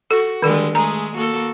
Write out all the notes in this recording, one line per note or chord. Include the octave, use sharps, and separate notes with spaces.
F#4 A4
D3 D#3 G3 G#3 A4
G#3 A3 G#4 A#5
A#3 F#4 A4